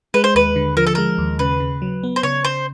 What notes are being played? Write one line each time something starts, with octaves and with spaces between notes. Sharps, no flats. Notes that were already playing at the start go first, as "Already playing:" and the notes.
G#3 B4
C5
D#2 B4
D3
F3 A#4
A4
G#3 A#4
D#2
C#3 B4
C#3
F#3
B3
C5
C#3 C#5
C#3 C5